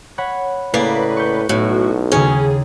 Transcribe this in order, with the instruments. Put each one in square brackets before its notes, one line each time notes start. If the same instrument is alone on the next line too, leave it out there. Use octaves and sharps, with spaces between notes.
[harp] C#5 F#5 B5
[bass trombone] A2 [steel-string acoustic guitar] C#3 A#3 D5 [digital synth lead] B4
[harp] C#6 G6
[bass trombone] B1 [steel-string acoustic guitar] A2 [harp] A3 [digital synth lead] F#4
[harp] D#2 C#3 [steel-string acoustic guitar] C#4 [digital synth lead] G#4